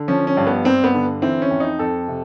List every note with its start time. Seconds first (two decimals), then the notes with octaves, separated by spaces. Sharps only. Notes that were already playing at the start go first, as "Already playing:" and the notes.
Already playing: D3
0.08 F3 C#4
0.27 C#4
0.37 G2
0.47 B3
0.65 G2 C4
0.84 B3
0.94 D3
1.22 E3 C4
1.42 C#4
1.51 F2
1.60 D#4
1.79 F2 A4
2.08 C3